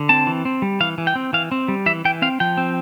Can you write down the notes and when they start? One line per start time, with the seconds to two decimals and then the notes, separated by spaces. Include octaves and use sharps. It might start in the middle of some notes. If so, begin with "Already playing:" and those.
Already playing: D3
0.09 C4 A5
0.27 E3
0.45 C4
0.62 G3
0.80 E3 F5
0.98 E3
1.07 G5
1.15 C4
1.33 E3 F5
1.52 C4
1.68 G3
1.86 E3 E5
2.05 E3 G5
2.22 C4 F5
2.40 F3 G5
2.57 C4